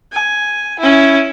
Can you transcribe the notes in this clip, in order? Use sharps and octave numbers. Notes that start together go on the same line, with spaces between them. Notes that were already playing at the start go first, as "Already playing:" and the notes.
G#5
C#4 E4